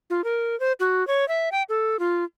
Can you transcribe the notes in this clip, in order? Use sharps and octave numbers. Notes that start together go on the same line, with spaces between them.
F4
A#4
C5
F#4
C#5
E5
G5
A4
F4